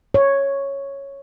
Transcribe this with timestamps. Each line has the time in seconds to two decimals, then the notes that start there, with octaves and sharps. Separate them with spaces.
0.14 C#5